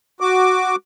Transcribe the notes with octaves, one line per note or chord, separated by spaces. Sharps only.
F#4 D6